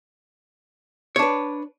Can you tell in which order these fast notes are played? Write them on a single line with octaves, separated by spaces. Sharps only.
C#5 D4 B4